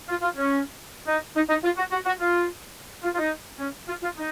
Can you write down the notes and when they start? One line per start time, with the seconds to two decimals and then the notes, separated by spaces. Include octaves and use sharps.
0.09 F4
0.22 F4
0.36 C#4
1.06 D#4
1.35 D#4
1.49 D#4
1.64 F4
1.77 F#4
1.91 F#4
2.05 F#4
2.19 F4
3.03 F4
3.14 F4
3.18 D#4
3.59 C#4
3.87 F4
4.02 F4
4.16 D#4